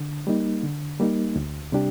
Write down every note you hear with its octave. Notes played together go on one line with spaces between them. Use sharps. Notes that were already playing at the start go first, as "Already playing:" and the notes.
Already playing: D3
G3 A#3 D#4
D3
G3 A#3 D#4
D2
C3 G3 D4 G4